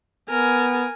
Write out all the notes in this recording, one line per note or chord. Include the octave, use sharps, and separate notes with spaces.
B3 A#4 G#5